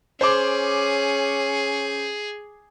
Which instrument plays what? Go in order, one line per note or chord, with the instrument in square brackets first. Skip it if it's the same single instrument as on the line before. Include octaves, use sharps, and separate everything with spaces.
[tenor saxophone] C#4 [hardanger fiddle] G#4 [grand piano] C5 D6